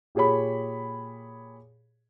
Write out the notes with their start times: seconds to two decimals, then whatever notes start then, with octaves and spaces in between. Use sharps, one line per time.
0.15 A#2 G4 G#4 C#5 B5